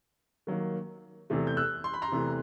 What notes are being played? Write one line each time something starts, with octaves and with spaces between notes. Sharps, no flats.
D#3 F#3 A#3
E2 C3 E3 A3
G6
E6 F#6
C6
B5
A#5 C6
E2 C3 E3 A3